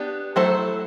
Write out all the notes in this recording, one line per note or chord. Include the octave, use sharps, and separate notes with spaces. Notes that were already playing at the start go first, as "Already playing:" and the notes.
Already playing: B3 D4 G4
F#3 A3 E4 A4 C5